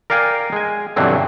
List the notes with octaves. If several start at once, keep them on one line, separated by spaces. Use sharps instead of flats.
A#4 D5 F5 G5 G#5
G#3 G#5
G2 B2 D3 E3 F#3 C4